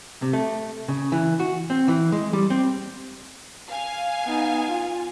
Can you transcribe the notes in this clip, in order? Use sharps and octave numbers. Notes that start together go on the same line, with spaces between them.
C3
A3
C#3
E3
F#4
C4
E3
G#3
G3
C4
F5 G#5
B3 D#4
F4